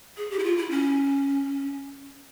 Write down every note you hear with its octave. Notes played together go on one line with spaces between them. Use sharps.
G#4
G4
E4
F4
E4
C#4